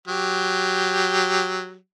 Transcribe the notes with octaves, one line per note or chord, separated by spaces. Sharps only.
F#3 G4